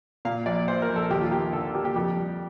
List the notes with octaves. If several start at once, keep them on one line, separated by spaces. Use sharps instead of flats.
A#2 F5
A#1 D5
A#1 C5
A#4
A#1
A4
D#2 G4
F4
A#3 G4
D3 A4
A#3 G4
G4
F2 G4
G3